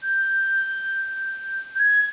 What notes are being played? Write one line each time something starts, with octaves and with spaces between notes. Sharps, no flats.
G6
G6
G#6